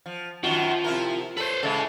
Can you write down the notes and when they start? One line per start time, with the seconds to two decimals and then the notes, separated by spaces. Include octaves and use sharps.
0.06 F3
0.43 F#2 D#3 F3 F#4
0.84 C3 E4 A#4
1.37 A4 B4 C5
1.63 C#3 G#3 E4 A4